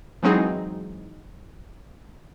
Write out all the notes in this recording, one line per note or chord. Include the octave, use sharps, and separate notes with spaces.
E3 F#3 G#3 C4 D#4 G#4